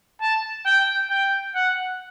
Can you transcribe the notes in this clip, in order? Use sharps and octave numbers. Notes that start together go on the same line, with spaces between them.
A5
G5
G5
F#5